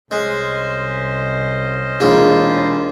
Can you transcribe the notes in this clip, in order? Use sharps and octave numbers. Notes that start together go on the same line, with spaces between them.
C2 G#3 C#4 C5 D#5
E1 D#2 A#3 F4 G#4